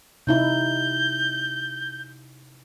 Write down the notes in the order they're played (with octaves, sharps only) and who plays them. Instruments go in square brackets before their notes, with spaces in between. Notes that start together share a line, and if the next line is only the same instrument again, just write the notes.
[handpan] C3 D#4 E4 [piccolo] G6